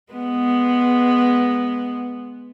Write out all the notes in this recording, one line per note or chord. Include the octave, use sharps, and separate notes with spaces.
G#3 B3